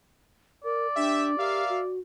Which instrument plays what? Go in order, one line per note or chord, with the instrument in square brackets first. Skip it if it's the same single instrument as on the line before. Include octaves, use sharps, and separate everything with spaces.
[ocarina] A#4 [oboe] D5
[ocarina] D4 [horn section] G4 E5
[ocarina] G4 [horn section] A#4 E5 F5
[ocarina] F#4